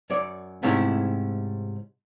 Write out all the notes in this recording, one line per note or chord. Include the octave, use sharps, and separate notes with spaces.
F#2 C#5 D5
G#2 C3 A3 C#4 E4